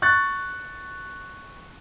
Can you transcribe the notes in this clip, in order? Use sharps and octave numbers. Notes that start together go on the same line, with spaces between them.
C#6 F#6 A6